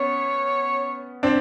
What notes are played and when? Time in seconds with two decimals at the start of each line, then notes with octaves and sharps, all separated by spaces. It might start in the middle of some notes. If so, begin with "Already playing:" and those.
Already playing: B3 C#4 C#5
1.23 C4 D4